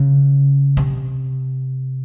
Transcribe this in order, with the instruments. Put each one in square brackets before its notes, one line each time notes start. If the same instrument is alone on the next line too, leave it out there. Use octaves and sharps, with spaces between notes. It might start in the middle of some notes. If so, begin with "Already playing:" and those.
Already playing: [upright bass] C#3
C3